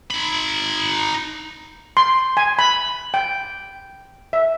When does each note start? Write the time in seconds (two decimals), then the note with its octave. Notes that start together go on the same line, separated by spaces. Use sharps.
0.10 D#4 B5
1.97 C6
2.37 G#5
2.59 B5
3.14 G5
4.33 E5